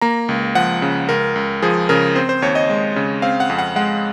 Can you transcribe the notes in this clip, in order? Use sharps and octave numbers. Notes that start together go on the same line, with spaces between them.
A#3 A#5
C#2
F3 F#5
C#3
C#2 A#4
C#2
F3 G#4
C#3 A#4
C4 C5
C5
D#2 C#5
D#5
G#3
C#3
C4 F5
F#5
F2
F#5
G#3 F#5